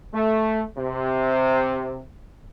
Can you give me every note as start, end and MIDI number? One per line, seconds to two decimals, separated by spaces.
0.14 0.62 57
0.77 1.99 48